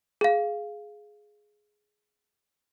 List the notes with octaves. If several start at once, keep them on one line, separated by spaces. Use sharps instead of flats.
G#4 F5